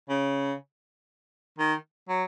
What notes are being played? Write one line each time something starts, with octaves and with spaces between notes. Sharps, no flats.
C#3
D#3
F#3